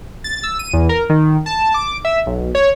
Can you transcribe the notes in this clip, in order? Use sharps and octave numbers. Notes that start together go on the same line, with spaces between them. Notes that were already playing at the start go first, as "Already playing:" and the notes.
A6
E6
D#7
E2
A#4
D#3
A5
D6
E5
B1
C#5